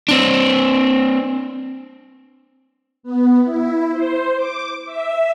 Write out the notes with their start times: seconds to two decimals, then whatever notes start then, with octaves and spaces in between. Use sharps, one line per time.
0.08 C4 D4
3.03 B3
3.44 E4
3.91 C5
4.36 D6
4.85 E5